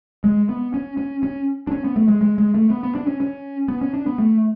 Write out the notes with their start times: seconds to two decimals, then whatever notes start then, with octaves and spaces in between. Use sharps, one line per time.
0.24 G#3
0.49 B3
0.74 C#4
0.97 C#4
1.23 C#4
1.67 D4
1.71 C#4
1.84 B3
1.96 A3
2.08 G#3
2.21 G#3
2.38 G#3
2.54 A3
2.70 B3
2.83 B3
2.95 D4
3.07 C#4
3.20 C#4
3.68 B3
3.81 C#4
3.94 D4
4.06 B3
4.18 A3